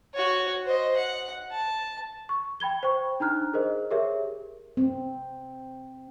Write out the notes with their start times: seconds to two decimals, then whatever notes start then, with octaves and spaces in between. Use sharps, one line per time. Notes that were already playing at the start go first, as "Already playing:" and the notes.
0.14 F#4 C#5
0.65 C5 D#5
0.96 F#5
1.52 A5
2.29 C#6
2.60 G5 B5 G#6 G7
2.83 C5 G5 C#6
3.20 D4 D#4 A#5 F6 F#6
3.53 G#4 A#4 C5 D#5
3.91 G4 G#4 A#4 C#5 E5
4.77 C4